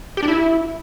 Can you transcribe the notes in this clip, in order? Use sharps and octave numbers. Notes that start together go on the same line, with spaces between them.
G4
D4
E4